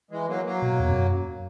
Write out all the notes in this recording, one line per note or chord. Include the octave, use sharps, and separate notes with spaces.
E3 G#3
F#3 A#3
F#3 A#3
B2
E2
F#2